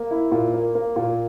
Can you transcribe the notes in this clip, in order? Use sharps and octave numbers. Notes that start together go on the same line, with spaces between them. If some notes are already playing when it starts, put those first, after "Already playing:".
Already playing: A#3
E4
A#2
A#3
A#3
A#2